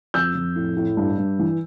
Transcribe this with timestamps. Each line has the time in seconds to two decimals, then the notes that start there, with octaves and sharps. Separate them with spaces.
0.14 F2 E6 G6
0.35 F2
0.56 A2
0.77 A2
0.97 G2
1.18 G2
1.39 E3